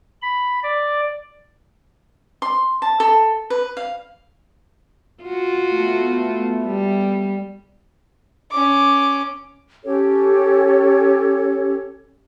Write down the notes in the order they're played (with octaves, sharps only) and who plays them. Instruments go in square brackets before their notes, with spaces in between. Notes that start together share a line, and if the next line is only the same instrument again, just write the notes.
[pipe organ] B5
D5
[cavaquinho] C6
A5
A4
B4
F5
[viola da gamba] F4 F#4
[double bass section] A3 B3
[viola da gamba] G3
[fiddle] C#4 D6
[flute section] C#4 G4 A4 C#5